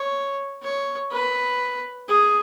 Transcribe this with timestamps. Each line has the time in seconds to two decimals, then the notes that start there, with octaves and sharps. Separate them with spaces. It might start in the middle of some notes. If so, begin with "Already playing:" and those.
Already playing: C#5
0.62 C#5
1.12 B4
2.08 G#4